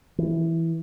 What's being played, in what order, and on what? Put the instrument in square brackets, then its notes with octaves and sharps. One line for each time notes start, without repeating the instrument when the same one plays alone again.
[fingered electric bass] E3